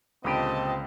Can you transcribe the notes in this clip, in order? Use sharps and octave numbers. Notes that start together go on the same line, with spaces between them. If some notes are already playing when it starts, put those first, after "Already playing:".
C#2 A#2 D3 C4 G4 D#5 A5 B5